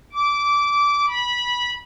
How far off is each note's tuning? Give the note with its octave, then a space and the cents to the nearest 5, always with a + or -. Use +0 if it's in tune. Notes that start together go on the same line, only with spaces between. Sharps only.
D6 -20
B5 -20